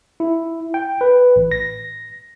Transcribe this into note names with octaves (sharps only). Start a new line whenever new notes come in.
E4
G5
B4
A1
A#6